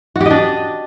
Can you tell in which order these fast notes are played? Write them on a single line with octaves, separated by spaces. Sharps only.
F#4 G4 D#5 D4